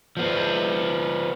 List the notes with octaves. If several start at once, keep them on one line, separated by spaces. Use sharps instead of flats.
F3 B3